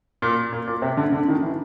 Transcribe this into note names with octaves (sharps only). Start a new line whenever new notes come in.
A#2
A#2
A#2
C3
D3
D3
D#3
E3